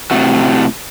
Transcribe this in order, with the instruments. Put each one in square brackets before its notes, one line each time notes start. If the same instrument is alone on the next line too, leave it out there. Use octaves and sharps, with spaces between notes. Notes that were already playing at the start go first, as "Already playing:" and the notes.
[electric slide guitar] A2 C3 A3 F#4